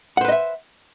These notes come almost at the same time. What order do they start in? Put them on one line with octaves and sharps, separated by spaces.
F#5 C5 B4 D#5 E5